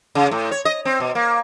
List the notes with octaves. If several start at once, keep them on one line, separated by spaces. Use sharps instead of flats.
C#3
A2
C#5
D#5
C4
B2
A#3